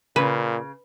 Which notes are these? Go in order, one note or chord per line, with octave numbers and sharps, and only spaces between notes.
A#2 C#3 B4